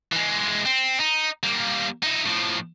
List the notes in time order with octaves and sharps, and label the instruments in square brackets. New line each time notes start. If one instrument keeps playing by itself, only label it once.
[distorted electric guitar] E3 G#3
C4
D#4
G3 A#3
D#4 E4
A2 F3